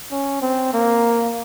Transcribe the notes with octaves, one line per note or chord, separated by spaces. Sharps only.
C#4
C4
A#3